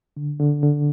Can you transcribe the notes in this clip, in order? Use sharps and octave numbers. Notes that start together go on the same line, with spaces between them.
D3
D3
D3